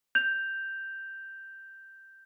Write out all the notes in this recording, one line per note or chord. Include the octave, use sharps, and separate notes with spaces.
G6 F7